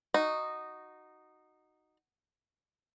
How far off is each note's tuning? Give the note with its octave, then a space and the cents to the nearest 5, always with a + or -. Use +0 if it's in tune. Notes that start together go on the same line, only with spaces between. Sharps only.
D#4 -10 F#4 +0